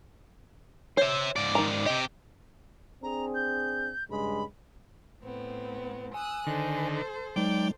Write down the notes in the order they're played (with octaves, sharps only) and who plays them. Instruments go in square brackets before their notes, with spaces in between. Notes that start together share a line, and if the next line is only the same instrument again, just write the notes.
[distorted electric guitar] C5 E5 [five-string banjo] C#5
[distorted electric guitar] G#2 D5
[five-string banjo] D#3 A#5
[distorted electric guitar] C3 G4 [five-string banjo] D#5
[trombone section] C4 D4 G#4 [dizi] A#5
[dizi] G6
[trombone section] G2 C#3 G#3 [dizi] B5
[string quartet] A2 B3 C4
[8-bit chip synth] G#5 [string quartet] D#6 E6 F#6
[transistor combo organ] D3 D#3 [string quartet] A4 C5
[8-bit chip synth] F#3 G#3 D#4 [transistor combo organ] D5 G5